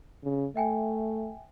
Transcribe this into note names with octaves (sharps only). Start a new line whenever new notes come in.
C#3
A3 E5 G5 G#5